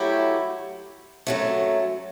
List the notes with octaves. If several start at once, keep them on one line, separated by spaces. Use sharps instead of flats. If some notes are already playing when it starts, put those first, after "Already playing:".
Already playing: F#3 A3 E4 G4
F#2 F#3 A3